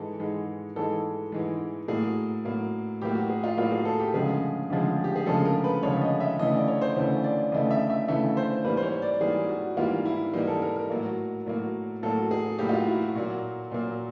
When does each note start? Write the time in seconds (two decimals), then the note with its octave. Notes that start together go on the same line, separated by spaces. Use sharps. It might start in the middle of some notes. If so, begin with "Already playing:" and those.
Already playing: G#2 E3 G#3 A4
0.20 G#2 E3 G#3
0.76 G#2 E3 G#3 A4
1.32 G#2 E3 G#3
1.88 A2 F#3 A#3 G#4
2.45 A2 F#3 A#3
3.02 A2 F#3 A#3 G4
3.15 F#4
3.29 G#4
3.44 F4
3.57 A2 F#3 A#3 F4
3.72 G#4
3.85 A4
4.00 G4
4.14 D2 C#3 F3 G#3 G#4
4.70 D2 C#3 F3 G#3
5.04 G4
5.16 G#4
5.26 D2 C#3 F3 G#3 A4
5.45 A#4
5.64 B4
5.83 D2 C#3 F3 G#3 C#5
6.02 D#5
6.20 E5
6.39 D2 C#3 E3 A3 D#5
6.54 D5
6.68 C#5
6.81 C5
6.96 D2 C#3 E3 A3 C#5
7.24 D5
7.52 D2 C#3 E3 A3 D#5
7.71 E5
7.90 E5
8.08 D2 C#3 E3 A3 E5
8.37 C5
8.65 G#2 E3 G3 A#3 B4
8.77 C5
8.83 C#5
9.02 D5
9.21 G#2 E3 G3 A#3 G#4
9.49 F#4
9.77 G#2 E3 G3 A#3 F4
10.05 E4
10.33 G#2 E3 G3 A#3 D#4
10.48 A4
10.62 A#4
10.76 A#4
10.90 A2 F#3 A#3
11.46 A2 F#3 A#3
12.03 A2 F#3 A#3 A4
12.31 G#4
12.59 A2 F#3 A#3 G4
12.69 F4
12.73 F#4
12.87 E4
13.02 F#4
13.15 A#2 F#3 A#3 F#4
13.71 A#2 F#3 A#3